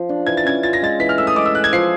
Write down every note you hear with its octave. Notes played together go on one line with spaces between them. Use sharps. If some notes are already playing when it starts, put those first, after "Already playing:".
Already playing: F3
D4
E3 G#6
A6
C#4 G#6
F4 A6
A#6
G#3 A6
E3 B6
F6
A3 E6
D#6
G#3 D6
E6
G#4 F#6
G#6
F3 C7